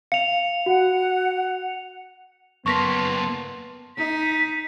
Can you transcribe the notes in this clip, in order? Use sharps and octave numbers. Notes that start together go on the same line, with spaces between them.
F5 C#7 F7
F#4 F#5
F#2 A#3 B3 A5 C6 C#6 A#6 B6
D#4 B6